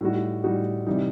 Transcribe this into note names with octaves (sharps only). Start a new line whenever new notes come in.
A2 G3 D#4 F#4
A2 G3 D#4 F#4
C3 E3 G3 D#4